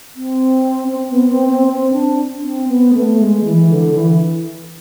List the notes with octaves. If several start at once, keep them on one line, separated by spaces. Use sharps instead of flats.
C4
C4
B3
C4
C4
C4
D4
C4
B3
A3
G#3
E3
D3
E3